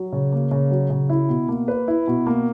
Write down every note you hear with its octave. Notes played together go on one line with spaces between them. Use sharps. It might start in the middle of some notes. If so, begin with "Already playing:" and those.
Already playing: F#3
C#3
A#3
C#3
F#3
C#3
E4
B2
A#3
B4
E4
B2
A#3